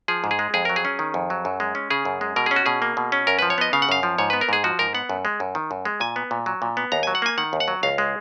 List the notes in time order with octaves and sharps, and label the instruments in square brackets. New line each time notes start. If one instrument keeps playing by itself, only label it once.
[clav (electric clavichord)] F3 G#4
G#2
G#4
G#3
F2 G#4
F#3 A#4
G#4
C#4
D#3
F2
F#3
F#2
G#3
C#4
C#3 G#4
F#2
G#3
B2 A#4
C#4 G#4
F#4
B2 G#4
A#3
B2
C#4
F#2 A#4
F3 B4
C#5
B3 D#5
C#3 F5
F#5
F#2 F5
F3
G#2 C#5
B3 B4
A#4
G#2 G#4
F3 F#4
G#2 A#4
B3 F#5
F#2
G#3
F#2
D#3
F#2
G#3
A#2 G#5
B3
A#2
F#3
A#2
B3
D#2 A#5
F#3 G#5
F#5
A#3 G#5
D#3 F#5
D#2
F#5
F#3
C#2 F5
G#3